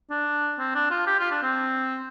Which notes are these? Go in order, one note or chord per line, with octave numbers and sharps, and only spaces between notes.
D4
C4
D4
F4
G4
F4
D4
C4